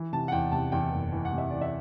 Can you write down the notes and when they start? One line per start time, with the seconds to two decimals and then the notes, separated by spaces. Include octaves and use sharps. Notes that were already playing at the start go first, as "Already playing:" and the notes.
Already playing: E3
0.13 C3 A5
0.28 F#5
0.32 E2 G5
0.52 C3 A5
0.72 E2 G5
0.92 F#1
1.12 E3
1.25 F#5
1.33 C3
1.38 E5
1.50 E3 D5
1.61 E5